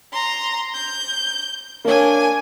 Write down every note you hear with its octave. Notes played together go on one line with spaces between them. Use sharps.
A#5 C6
G6
A#3 D4 C#5 G#5